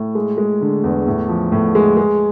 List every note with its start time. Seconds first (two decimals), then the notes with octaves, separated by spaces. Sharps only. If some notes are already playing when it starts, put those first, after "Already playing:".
Already playing: A2
0.15 G#3
0.38 G#3
0.61 D3
0.84 E2
1.07 A2
1.29 F3
1.52 A2
1.75 G#3
1.97 G#3